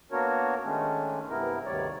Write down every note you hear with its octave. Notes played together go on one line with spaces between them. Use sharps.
A#3 B3 D4 F#4 A#4 C#5
D#3 G#3 A3 C#4 D4
G2 C3 B3 E4 A#4
D2 G2 C3 D#3 C#5 D5